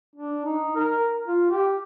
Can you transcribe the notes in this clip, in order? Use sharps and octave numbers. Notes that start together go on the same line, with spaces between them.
D4
D#4
A#4
F4
G4